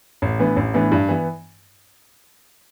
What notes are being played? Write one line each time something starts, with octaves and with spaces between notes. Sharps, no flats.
A1
A2 E3 B3 D4
A1
A2 E3 B3 D4
G2
E3 B3